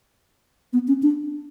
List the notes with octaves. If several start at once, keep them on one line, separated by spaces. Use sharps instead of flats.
B3
C#4
D4